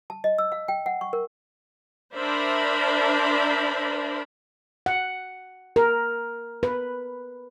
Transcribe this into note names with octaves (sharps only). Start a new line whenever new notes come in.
A5
D#5
E6
F5
G5
F#5
C#6
A#4
D4 A#4 C5 D5 E5 B5
F#5
A#4
B4